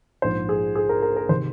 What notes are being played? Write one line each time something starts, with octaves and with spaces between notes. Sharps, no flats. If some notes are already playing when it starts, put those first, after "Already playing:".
A#1 G#2 F3 C5
G#4
G#4
A#4
A#4
A#4
C3 D#3 C5